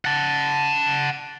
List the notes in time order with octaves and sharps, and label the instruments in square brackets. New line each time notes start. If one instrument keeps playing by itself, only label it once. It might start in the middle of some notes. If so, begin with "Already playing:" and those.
[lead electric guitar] F#5 A5